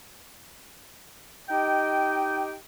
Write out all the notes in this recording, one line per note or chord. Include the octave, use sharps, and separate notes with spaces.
D#4 G4 D#5 G5